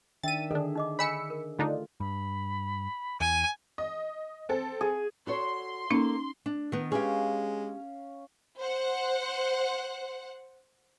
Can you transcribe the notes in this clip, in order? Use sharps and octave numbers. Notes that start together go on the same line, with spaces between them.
D#3 D4 E5 G5 A6 D#7
D3 D#3 D4 G#4 A4
D#4 D#5 D6
C#5 D#5 G#5 B5 E6 C#7
A#4
D3 A3 D4 D#4 F4
G2 B5
E2 G#5 D#7
D#5
C4 A4
G#4
F#4 A4 C#5 C6
A#3 C#4 D#4 A4
D4
D#3 B3
G#3 C#4 G4 G#4 F5
C5 F#5